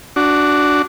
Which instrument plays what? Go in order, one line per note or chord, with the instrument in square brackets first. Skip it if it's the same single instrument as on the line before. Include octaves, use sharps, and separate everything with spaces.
[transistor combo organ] D4 F#4